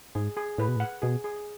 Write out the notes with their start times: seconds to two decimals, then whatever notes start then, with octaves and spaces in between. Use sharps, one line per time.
0.15 G#2 G#4
0.37 G#4
0.58 A2 B4
0.68 B2
0.76 A2
0.80 F#5
1.02 B2 G#4
1.24 G#4